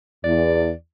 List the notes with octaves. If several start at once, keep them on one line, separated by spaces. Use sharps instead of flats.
E2 D5